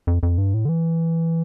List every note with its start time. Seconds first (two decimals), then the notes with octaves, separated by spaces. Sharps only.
0.07 F2
0.23 F2
0.38 G2
0.54 A2
0.65 D3
0.69 E3